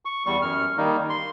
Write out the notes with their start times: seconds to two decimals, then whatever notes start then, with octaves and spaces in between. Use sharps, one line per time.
0.05 C#6
0.26 E2 G3 C#6
0.42 F#2 F6
0.77 D#3 G3 A#3 D#4
1.10 C6